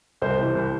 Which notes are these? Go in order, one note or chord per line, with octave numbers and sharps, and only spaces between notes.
C2 C5
C3 E3
C2